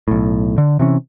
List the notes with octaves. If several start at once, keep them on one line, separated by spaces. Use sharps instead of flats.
B1 A2
D3
C3 E3 C#4